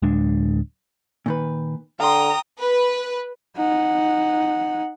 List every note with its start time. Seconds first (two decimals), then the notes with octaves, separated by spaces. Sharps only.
0.02 D1 G#3 D4
1.26 A#2 D#3 B4
2.00 D3 F5 G5 A#5 C6 D#6
2.60 B4
3.57 D#4 F#5